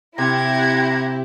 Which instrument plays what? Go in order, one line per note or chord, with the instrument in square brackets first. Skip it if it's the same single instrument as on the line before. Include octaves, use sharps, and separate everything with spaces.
[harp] C3 [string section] E4 G4 [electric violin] F#5 G#6 [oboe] A#5